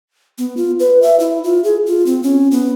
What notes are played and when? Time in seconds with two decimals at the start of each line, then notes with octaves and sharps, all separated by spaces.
0.38 B3
0.57 F4
0.80 B4
1.02 E5
1.20 E4
1.44 F4
1.64 G#4
1.86 F4
2.06 C4
2.23 C#4
2.51 B3